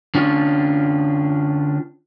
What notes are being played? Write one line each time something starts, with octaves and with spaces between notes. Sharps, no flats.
D3 C#4 D4 F4